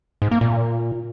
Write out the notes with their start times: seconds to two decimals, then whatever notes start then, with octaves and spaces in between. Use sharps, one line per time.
0.22 G#2
0.31 A#3
0.41 A#2